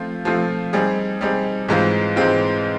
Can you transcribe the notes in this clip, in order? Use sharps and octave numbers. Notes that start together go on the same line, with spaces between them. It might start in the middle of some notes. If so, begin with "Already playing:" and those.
Already playing: F3 A3 C4 F4
F3 A3 C4 F4
G3 C4 D#4 G#4
G3 C4 D#4 G#4
G#2 E3 G#3 C4 F4
G#2 E3 G#3 C4 F4